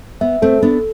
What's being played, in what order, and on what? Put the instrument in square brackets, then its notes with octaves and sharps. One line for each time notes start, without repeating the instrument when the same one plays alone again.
[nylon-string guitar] B3 [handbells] E5
[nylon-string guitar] A3 C4 [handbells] A4
[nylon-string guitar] B3 D4 [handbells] A4